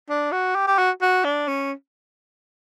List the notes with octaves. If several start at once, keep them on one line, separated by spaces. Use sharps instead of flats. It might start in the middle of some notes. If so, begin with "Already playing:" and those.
D4
F#4
G4
G4
F#4
F#4
D4
C#4